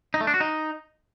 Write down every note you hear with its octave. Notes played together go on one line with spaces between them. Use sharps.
D#4
A3
D4
F#4
D#4